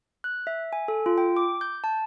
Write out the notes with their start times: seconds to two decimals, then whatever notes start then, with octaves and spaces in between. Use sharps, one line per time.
0.24 F#6
0.47 E5
0.73 G#5
0.88 A4
1.06 F4
1.18 G5
1.37 D6
1.61 G6
1.84 A5